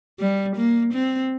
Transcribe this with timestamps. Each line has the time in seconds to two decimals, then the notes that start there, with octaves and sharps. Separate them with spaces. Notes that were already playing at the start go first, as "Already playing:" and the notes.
0.20 G3
0.56 A#3
0.93 C4